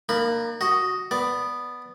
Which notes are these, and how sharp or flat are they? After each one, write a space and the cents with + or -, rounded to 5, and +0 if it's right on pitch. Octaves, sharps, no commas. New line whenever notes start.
A#3 -5 D4 +45 B5 +0
F#4 +0 D#5 +0
B3 +0 D5 +0